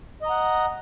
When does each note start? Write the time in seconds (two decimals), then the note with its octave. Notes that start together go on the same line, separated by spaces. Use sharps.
0.22 D#5
0.26 A#5
0.30 F#5